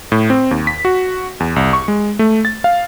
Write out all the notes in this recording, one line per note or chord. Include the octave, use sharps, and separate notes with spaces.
A2
C4
D#2
B6
F#4
E2
C2
C#6
G#3
A3
A6
F5